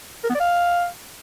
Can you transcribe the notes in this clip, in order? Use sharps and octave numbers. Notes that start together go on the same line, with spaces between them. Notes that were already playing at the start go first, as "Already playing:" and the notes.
A#4
B3
D5
F5